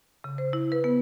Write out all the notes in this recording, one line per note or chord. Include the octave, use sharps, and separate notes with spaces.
C#3
C5
E4
B4
B3